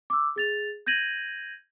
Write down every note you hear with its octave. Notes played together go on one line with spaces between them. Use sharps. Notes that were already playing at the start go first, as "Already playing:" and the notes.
D6 E6
G#4 A6 F7
G6 G#6 A#6 D#7 F#7